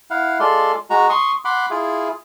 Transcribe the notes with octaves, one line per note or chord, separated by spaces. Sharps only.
E4 F5 F#5
G#3 F4 A4 D5 C6
G#3 F#4 A#5
C6 C#6 D#6
F#5 B5 C6 D6
E4 F4 G#4